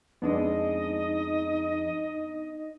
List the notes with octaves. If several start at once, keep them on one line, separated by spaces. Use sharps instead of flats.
F2 G#3 B3 D4 D#4 D#5